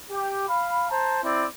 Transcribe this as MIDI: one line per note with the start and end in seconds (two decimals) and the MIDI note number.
0.11 0.48 67
0.48 0.86 77
0.48 0.86 83
0.89 1.20 72
0.89 1.20 81
0.89 1.20 82
1.23 1.45 60
1.23 1.45 64
1.23 1.45 74